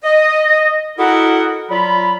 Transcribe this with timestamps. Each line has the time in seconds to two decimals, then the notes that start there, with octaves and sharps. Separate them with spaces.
0.04 D#5
0.98 E4 F#4 A4 A#4 D#5 F#5
1.70 F#3 F4 D5 B5